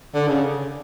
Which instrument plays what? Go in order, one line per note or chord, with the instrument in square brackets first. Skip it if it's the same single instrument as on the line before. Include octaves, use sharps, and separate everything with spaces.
[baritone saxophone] D3
C#3